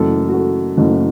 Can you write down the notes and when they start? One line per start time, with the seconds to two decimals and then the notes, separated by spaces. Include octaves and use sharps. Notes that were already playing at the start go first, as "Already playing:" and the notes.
Already playing: F#1 F#2 E3 A3 A4
0.29 F#4
0.34 A4
0.77 F#1 F#2 E3 A3